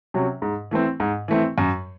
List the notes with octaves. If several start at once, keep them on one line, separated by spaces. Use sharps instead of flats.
C3 F#3 C#4
G#2
E3 A3 C4
G#2
E3 A3 C4
F#2